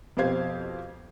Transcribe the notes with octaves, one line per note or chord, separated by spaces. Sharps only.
F2 B2 G4 C5 F5 G#6